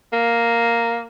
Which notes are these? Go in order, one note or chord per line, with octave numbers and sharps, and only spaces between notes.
A#3